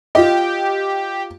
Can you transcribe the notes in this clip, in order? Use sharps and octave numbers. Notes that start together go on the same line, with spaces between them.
F4 G4 D#5